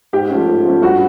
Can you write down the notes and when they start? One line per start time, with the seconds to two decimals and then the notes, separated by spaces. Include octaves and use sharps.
0.13 G#2 G4
0.30 F3 A3 C#4
0.47 G#2
0.65 F3 A3 C#4
0.82 G2 F#4